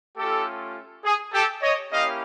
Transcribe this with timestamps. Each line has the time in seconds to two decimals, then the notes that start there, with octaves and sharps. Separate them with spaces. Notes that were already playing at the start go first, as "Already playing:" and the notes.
0.17 A3 C#4 F4 G4 A4
1.04 G#4
1.33 G4 A4
1.62 C#5 D#5
1.92 A#3 C#4 E4 G4 D#5 F5